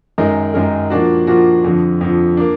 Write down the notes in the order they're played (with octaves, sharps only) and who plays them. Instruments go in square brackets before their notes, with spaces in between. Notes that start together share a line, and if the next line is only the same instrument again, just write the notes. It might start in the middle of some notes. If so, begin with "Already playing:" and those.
[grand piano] F#2 D#3 G#3 D#4 A#4
F#2 D#3 G#3 D#4 A#4
A#2 F3 A#3 D4 F#4
A#2 F3 A#3 D4 F#4
F2 D3 F3
F2 D3 F3
A#3 D4